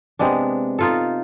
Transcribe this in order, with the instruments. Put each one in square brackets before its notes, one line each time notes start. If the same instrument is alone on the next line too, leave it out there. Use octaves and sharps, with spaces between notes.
[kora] C3 G#3 B3 D4
D#4 F4 A4